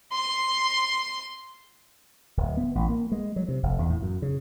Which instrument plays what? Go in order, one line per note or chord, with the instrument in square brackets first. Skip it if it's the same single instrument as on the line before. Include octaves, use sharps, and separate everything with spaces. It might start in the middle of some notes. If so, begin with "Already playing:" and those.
[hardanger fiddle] C6
[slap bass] D1
B3
A1
A#3
G#3
F#3
C3
F1
E2
A2
F#2
C#3